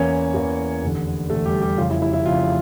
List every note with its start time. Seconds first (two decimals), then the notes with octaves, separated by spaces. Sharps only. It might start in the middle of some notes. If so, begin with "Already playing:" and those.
Already playing: E2 E3 A#3 C#4 C#5
0.34 E2 E3 A#3
0.82 F1 E2 D3
1.30 F1 E2 D3 A3 A4
1.46 G3 G4
1.62 G3 G4
1.78 F1 F2 C#3 F4
1.90 E4
2.02 E4
2.13 E4
2.25 F1 F2 C#3 F4